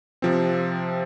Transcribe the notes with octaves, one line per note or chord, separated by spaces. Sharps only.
C3 F3 C4